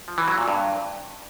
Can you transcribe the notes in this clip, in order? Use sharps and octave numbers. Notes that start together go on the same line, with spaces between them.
F3
E3
F#3
A#2
G2